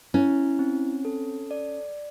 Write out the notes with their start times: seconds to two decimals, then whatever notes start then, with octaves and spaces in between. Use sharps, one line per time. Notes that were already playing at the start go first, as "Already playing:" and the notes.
0.14 C#4 E4
0.59 C4
1.05 A4
1.51 D5